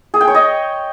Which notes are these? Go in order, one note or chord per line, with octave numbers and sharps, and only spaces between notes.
G#4
G5
C#5
D#5